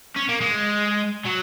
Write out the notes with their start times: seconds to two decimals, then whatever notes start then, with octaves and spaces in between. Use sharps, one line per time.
0.16 C#4
0.29 A#3
0.41 G#3
1.26 F#3